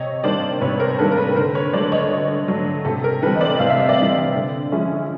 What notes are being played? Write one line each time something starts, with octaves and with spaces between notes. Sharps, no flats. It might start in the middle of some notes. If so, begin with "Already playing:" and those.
Already playing: C3 C#5 D#5
D#3 G3 A#3 D4 C5 D5
C3 B4 C#5
A#4 C5
D#3 G3 A#3 D4 A4 B4
A#4
A4 B4
D3 A#4 C5
B4 C#5
F#3 A3 D4 C5 D5
C#5 D#5
D3
F#3 A3 D4
C3 A4
A#4
E3 G3 C4 A4 B4
D#5
C5 D5
C3 F5
E5
D#5
D5 E5
E3 G3 C4
D3
F3 G#3 C#4 E4